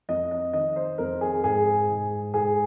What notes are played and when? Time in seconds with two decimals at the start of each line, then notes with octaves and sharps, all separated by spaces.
0.09 F2 D#5
0.31 D#5
0.53 D#3 D#5
0.76 C5
0.98 F2 A#4
1.21 G#4
1.44 G#2 G#4
1.89 G#2
2.34 G#2 G#4